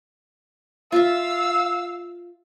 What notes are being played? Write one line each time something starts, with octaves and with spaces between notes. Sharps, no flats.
F4 E5 F5 E6